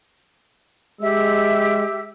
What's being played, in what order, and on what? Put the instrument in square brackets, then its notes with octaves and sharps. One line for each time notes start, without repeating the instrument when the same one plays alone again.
[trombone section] G#3 [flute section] G4 E5 E6